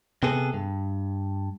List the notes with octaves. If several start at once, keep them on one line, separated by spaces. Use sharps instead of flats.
C3 B3 G#4 A4
G2